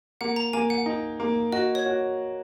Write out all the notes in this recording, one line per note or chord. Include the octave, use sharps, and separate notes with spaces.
A#3 F#5
A#5
A#3 G#5
F#5
D#4
A#3
F#4 D#5
C#5
F#4